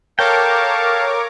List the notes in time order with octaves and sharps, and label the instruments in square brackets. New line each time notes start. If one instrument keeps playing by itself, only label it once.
[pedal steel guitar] A4 G5 [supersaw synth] A#4 C#5 D6 [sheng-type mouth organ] F5 A5